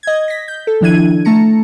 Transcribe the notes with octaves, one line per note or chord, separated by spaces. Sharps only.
D#5 G#6
A#6 B6
G6
A4
D#3 F3 D4 E4 G#6 D#7
A3 A5 A#5 C#7